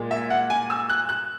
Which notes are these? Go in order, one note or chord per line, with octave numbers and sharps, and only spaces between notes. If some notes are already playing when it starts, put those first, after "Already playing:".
Already playing: A#2 G#3
E5
F#5
G#5
E6
F#6
F#6